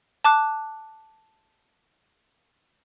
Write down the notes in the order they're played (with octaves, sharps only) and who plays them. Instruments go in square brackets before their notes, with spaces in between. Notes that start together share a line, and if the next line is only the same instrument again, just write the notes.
[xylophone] A5 D6 F#6